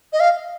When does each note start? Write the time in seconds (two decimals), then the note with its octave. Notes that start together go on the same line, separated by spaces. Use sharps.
0.13 D#5
0.20 F5